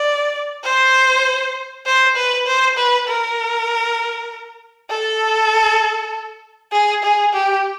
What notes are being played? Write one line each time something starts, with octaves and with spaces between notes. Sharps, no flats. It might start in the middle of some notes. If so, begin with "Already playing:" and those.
Already playing: D5
C5
C5
B4
C5
B4
A#4
A4
G#4
G#4
G4